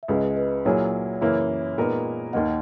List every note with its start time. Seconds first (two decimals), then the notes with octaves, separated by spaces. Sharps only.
0.03 E5
0.08 C#2 C#3 G#3 B4 D#5
0.36 B4 D#5
0.65 A#2 F#3 A#3 E4 G#4 C#5 E5
1.21 F#2 C#3 E3 A#3 E4 C#5 E5
1.78 A#2 G#3 B3 D#4 A#4
2.33 D#2 D#3 A#3 D#5 F#5